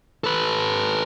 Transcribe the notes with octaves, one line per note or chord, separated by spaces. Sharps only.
A4 B4